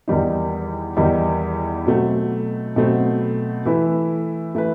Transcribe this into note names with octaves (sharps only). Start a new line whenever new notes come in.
E2 D#3 G3 D#4
E2 D#3 G3 D#4
B2 F#3 A3 C4
B2 F#3 A3 C4
E3 A3 E4 B4
E3 A3 E4 B4